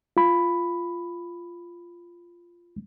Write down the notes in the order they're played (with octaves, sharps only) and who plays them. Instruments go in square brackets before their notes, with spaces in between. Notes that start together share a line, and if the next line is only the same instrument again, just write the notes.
[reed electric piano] F4 B5